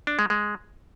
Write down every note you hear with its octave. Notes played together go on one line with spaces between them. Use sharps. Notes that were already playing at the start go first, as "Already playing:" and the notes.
D4
G#3
G#3